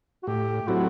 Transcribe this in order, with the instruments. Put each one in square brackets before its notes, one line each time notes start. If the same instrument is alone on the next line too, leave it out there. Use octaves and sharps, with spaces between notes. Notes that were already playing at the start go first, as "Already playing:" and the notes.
[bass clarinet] F#4
[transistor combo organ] A2 [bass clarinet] G4
[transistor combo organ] F#3 A3 C4 F#4 [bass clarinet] E4